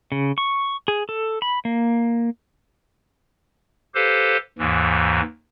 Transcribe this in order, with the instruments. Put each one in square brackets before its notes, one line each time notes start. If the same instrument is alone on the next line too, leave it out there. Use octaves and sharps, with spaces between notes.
[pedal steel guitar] C#3
C#6
G#4
A4
B5
A#3
[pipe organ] G4 A4 B4 C5 F5
D#2 G#2 E3